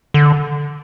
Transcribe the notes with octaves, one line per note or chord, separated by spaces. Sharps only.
D3